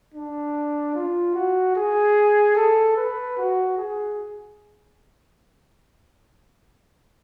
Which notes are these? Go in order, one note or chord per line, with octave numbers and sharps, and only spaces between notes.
D4
F4
F#4
G#4
A4
B4
F#4
G#4